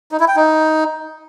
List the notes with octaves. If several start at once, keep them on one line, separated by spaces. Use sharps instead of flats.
D#4
E4
G5
D#4